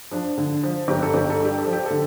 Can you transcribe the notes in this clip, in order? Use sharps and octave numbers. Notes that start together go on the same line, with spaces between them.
F3 D4
D3
F3
G1 G4
A4
G1 G4
A4
G2 G4
A4
F3
G4
D3 A4